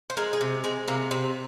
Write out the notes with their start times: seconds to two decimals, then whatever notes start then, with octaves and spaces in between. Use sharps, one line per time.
0.10 C5
0.17 G#3 A#4
0.33 G#4
0.41 C3
0.64 G#3 C4
0.88 C3 A#3
1.11 C3 C4